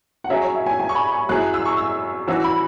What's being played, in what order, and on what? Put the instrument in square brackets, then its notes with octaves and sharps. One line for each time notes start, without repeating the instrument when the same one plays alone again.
[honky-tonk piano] F#5
[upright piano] F#3 C#4 G#4 [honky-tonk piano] E5
[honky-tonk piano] C#5
E5
G#5
G#5
C#6
B5
C#6
[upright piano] F#2 F#3 C#4 E4 G#4 [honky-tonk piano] F#6
[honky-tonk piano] E6
C#6
E6
[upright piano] E3 C#4 F#4 [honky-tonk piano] E6
[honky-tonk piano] B5